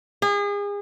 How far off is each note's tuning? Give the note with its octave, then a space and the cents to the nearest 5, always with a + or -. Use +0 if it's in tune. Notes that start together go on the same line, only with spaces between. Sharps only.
G#4 -35